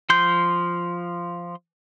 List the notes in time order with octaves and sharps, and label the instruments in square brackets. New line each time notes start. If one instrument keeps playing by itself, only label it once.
[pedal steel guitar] F3 C6 G6